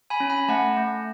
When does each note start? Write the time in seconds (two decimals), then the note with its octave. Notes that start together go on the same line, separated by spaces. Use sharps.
0.10 G#5 B5
0.20 C#4
0.30 G#5 B5
0.48 A3 F#5 A5
0.77 A3